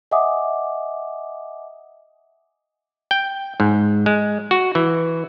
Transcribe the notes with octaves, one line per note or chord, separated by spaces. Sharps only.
D#5 E5 F#5 G#5 D6 D#6
G5
G#2
G#3
F#4
E3